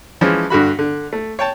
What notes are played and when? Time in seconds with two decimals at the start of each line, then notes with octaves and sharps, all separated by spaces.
0.21 E3 F3 G#3 C#4
0.50 G2 D3 F#4 B5
0.79 D3
1.13 A3
1.39 C#5 G5 A5